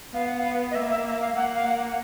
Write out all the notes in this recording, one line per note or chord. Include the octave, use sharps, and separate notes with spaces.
B3 F5
F#5
F5
D#5
A#3 E5
E5
E5
F5
A#3 F#5
F5
F#5